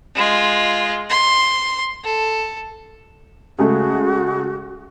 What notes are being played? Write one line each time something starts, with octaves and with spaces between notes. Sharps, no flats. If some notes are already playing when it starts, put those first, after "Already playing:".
G#3 F4
C6
A4
C#3 G#3 A3 F#4